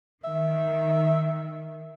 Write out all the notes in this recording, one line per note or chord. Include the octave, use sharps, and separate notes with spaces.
D#3 E5